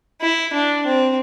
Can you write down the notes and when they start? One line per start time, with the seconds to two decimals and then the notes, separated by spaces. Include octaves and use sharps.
0.21 E4
0.53 D4
0.86 C4